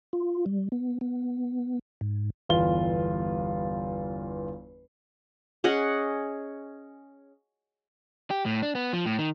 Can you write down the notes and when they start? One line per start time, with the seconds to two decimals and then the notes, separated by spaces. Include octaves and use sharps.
0.13 F4
0.46 G3
0.72 B3
1.01 B3
2.01 G#2
2.49 G1 E2 G2 F4 G7
5.64 C#4 G#4 D#5 F#5
8.31 G4
8.46 A2
8.62 D4
8.75 B3
8.93 F3
9.06 A2
9.18 D#3